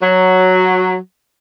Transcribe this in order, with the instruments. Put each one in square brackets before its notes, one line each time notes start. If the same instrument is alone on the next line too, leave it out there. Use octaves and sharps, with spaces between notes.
[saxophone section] F#3